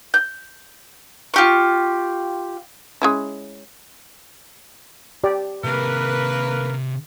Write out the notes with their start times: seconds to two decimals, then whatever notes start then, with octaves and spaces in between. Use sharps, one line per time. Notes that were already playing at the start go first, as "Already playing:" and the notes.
0.14 G6
1.34 F4 G4 C#6
3.02 G#3 C#4 E4
5.24 G4 D5
5.64 C3 A#3 G#4 A#4 B4